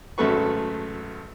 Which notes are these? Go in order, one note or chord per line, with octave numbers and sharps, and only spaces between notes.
G#1 F#2 A3 A4 B4 C#6